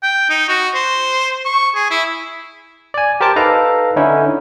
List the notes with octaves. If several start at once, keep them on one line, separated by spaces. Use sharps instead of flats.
G5
D#4
F#4
C5
C#6
G#4
E4
D5 G#5
G4 A#4 C5 A5 D6
D#4 A4 B4 F5 A#5
D3 C#4 D#4 E4